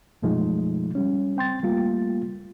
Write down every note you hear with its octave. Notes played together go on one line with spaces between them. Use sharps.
F#2 B2 F3 G#3 A3 D#4
G3 C#4
C4 G5 C6 A6
G3 A3 A#3 F4